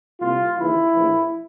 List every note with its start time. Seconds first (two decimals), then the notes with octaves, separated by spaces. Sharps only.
0.20 C2 A#2 F4
0.56 D#2 C#3 E3 E4
0.94 A#1 A2 E3